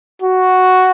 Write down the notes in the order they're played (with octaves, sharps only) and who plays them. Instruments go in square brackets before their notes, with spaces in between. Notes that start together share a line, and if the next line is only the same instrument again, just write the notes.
[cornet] F#4